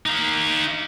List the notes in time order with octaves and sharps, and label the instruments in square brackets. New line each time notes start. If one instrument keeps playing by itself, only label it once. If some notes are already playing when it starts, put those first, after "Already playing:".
[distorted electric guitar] D#4 F5